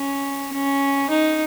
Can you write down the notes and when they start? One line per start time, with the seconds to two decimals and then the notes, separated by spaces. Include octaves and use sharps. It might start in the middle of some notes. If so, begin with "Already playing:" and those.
Already playing: C#4
0.52 C#4
1.10 D#4